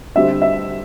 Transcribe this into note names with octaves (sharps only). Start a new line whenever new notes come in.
D3 G3 C4 E5
E5